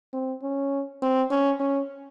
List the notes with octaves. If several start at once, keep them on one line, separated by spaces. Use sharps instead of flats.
C4
C#4
C4
C#4
C#4